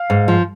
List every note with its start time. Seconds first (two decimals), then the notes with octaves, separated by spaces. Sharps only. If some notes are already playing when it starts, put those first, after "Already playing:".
Already playing: F5
0.10 G#2
0.28 F3